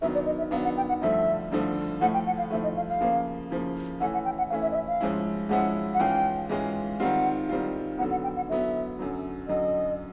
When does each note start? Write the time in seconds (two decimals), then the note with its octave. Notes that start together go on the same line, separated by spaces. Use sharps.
0.02 D#3 F#3 B3 D4 E5
0.14 D5
0.26 D#5
0.39 E5
0.51 D#3 F#3 B3 D4 F5
0.64 F#5
0.77 G5
0.88 F#5
1.02 G2 D3 F3 A3 E5
1.52 G2 D3 F3 A3
2.01 A2 F3 A3 F#5
2.14 G5
2.26 F#5
2.38 F5
2.51 A2 F3 A3 E5
2.63 D#5
2.76 F5
2.89 F5
3.01 C#3 F3 A#3
3.51 C#3 F3 A#3
4.00 E3 A3 C#4 E4 F#5
4.13 F#5
4.25 G5
4.38 F#5
4.50 E3 A3 C#4 E4 F5
4.62 E5
4.72 D#5
4.75 E5
4.88 F5
5.01 G#2 F3 G#3 C#4 E4
5.49 G#2 F3 G#3 C#4 E4 F#5
5.94 F#5
6.00 G#2 E3 G#3 C#4 F4 G5
6.49 G#2 E3 G#3 C#4 F4
7.00 D#3 G3 C4 F4 F#5
7.49 D#3 G3 C4 F4
7.98 D3 F#3 B3 F#5
8.11 F#5
8.23 G5
8.36 F#5
8.48 D3 F#3 B3 E5
8.99 F#2 D3 F#3
9.48 F#2 D3 F#3 D#5